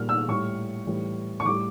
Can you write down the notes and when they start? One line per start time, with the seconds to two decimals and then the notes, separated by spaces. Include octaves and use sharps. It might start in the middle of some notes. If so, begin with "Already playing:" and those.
Already playing: A#2 G3 F6
0.09 E6
0.28 A2 G3 C#6
0.87 A2 E3 G3
1.40 C#6
1.45 A2 G3 D6